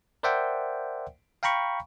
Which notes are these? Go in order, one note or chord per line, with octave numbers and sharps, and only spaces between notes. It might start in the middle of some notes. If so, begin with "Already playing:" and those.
A#4 C5 D5 E5 F#5 G5
F5 G5 A#5 B5 C#6